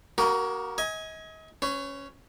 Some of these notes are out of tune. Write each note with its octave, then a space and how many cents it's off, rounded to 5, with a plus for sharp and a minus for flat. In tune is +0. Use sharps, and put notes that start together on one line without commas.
A#3 +45 F#4 +30 A#4 +0
D#5 +35 G#5 +0
C#4 +0 B4 +45